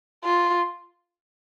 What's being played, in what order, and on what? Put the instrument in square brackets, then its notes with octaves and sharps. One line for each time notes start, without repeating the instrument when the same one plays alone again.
[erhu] F4